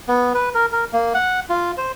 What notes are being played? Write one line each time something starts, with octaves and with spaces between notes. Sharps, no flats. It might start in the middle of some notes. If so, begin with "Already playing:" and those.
B3
B4
A#4
A#4
A#3
F#5
F4
C5